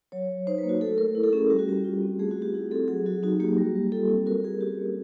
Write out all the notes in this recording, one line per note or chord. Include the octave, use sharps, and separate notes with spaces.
F#3 C#5
F#3
D#4 C5
A#3 B4
F#4
A3 A4
A3 A#4
E4
A4
C#4 G#4
G3 G4
F#4
G3 G4
F4
C4
A3 G#4
F#4
A3
G4
E4 G#4
C4 A4
F#3 G#4
F#3 F#4
D#4 F#4
A#3 G4
G3
G3
F4 A4
C4
F#4 A#4
G3 G#4
C#4 G4
A#3